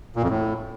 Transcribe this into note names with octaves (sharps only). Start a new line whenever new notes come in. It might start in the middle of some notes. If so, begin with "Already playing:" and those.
A#2
F2
A2